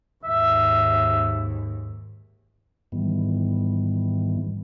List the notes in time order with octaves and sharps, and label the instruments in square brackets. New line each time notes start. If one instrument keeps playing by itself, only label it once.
[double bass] D#2 G#2 [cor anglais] E5
[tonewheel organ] G#2 D#3 E3 G3 B3